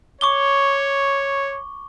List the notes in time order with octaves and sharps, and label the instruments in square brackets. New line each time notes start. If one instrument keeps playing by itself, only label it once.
[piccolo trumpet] C#5 [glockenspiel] C#6 D6 G7